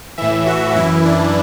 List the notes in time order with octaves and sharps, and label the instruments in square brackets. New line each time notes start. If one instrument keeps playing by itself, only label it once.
[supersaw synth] A2 E3 E5
F#4
F#2 E3 E4
D4